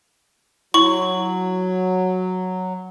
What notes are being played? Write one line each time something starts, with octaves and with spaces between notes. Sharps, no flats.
F#3 E4 C#6 F#7